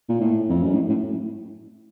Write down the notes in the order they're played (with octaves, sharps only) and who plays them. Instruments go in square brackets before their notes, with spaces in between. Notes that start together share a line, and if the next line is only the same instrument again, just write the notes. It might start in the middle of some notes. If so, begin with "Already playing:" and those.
[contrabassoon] A#2
A2
F2
F#2
A2
A2